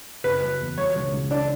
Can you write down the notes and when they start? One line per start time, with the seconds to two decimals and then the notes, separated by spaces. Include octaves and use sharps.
0.24 F#1 B4
0.42 F#3
0.60 E2
0.78 F#3 C#5
0.96 C#2
1.13 C#2
1.31 D4